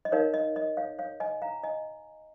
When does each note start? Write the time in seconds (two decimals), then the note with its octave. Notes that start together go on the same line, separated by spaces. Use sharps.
0.05 D#5
0.12 D#4 A#4 C#5 F5
0.34 D#5
0.56 D#5
0.77 C#5 F5
0.99 C#5 F5
1.20 D#5 G#5
1.42 F5 A#5
1.64 D#5 G#5